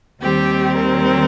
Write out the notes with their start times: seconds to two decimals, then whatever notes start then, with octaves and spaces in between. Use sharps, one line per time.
0.21 D#2 D#3 G3 C4 G4
0.75 A#4